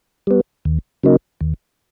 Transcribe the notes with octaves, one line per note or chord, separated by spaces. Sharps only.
G3 B3
D#2
C#3 F#3 A#3 D#4
D#2